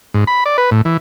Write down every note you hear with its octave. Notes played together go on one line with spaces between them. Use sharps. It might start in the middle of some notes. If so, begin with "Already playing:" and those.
G#2
B5
D5
B4
A2
E3